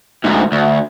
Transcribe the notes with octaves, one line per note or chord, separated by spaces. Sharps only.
D2 G#2
D2